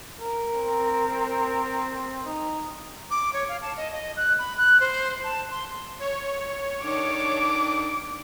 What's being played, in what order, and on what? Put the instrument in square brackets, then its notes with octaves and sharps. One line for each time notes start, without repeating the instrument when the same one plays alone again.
[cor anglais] A#4
[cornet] C4
[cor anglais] D#4
[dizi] D6
C#5
F5
A5
D#5
D#5
F#6
B5
F#6
C5
A5
C6
[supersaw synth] C#5
[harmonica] D#3 D4 [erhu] D6